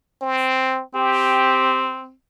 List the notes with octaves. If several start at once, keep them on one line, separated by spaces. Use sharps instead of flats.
C4
C4 G4